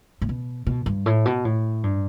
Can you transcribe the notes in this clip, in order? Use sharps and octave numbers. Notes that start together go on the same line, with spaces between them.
A2
B2
B2
G2
A2
B2
A2
G2